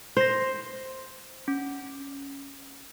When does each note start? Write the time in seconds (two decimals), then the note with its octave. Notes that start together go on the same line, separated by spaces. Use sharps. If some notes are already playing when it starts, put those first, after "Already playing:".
0.17 C5 C6 A#6
1.48 C#4